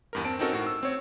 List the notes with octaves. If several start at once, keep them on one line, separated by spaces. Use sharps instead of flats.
E2 G2 A#4
C4 A5 D7
C4 C#4 D#4 F#4 A4 A#4
A2 F#4
E6
C4 C#5